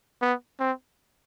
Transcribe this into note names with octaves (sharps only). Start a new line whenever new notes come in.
B3
C4